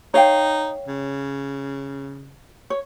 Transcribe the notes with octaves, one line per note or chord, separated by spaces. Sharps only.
D#4 C#5 F5 G5
C#3
C#5